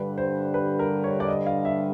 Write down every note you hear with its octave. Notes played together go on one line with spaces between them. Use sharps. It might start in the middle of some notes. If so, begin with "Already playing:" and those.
Already playing: G2 D3 G3 B4
C5
B4
A#4
C#5
D5
D#5
F5
E5